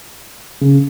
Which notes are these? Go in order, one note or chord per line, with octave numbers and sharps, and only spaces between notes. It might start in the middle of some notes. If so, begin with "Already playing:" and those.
C#3